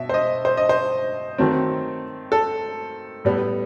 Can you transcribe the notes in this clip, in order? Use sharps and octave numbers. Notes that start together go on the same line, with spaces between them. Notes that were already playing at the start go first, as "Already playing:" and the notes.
Already playing: B2 E5
C5
D#5
C5
D#5
C5
D#3 F#3 A3 C4
A4
A2 G3 B3